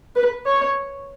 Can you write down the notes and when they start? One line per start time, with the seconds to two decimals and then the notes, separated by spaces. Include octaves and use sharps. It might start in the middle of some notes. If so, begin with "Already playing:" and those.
0.16 B4
0.46 C#5